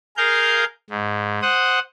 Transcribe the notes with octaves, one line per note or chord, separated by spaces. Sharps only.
G#4 A#4 F5 G6
G#2
C5 F#5 D#6